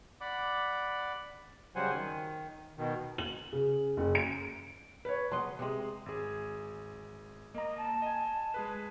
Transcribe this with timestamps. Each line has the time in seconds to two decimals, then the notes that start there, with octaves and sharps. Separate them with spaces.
0.21 D5 F#5 B5 D6
1.76 C#3 F#3 G3 C5 F#5 G#5
1.93 D#3
2.77 B2 D#3
3.18 F#7
3.53 C#3
3.97 F#1
4.15 D7
5.05 B4 C#5
5.32 C#2 F#3 D#5 C6
5.59 C3 G#3
6.06 G#1 G#4
7.55 A#3 D#5 A#5
7.78 A5
8.02 D#5 G#5
8.54 G#3 G#4 B4